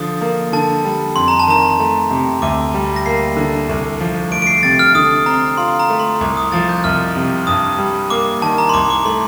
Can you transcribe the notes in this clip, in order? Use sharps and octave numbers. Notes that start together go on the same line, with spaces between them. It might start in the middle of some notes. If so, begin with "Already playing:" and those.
Already playing: D3 F3 D#6
A#3
D3 A5
G3
F2 C6
A#5
A5
D#3 A#5
A3
C3
D2 D6
G3
A#6
A#3 C7
D3
C2
F3
A3 D7
D7
C7
C3 A6
F6
D3 D#6
C4 A#5
F4 C6
A#5
A3
C6
C2 D6
D#6
F3 A6
G6
C2 F6
C3
G2 D#6
G3
A#3 D6
D#3 A5
A#5
C6
C2 D6
D6
A3 C6